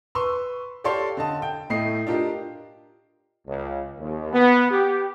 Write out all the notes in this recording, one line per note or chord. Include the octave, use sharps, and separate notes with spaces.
B4 C6 C#6 E6
G4 A4 C#5 D5 F5 C6
D3 D#5 A5
G5
A2 A3 D#5 C7
D4 F4 G4 A#4 D#5
C#2
D#2
B3
G4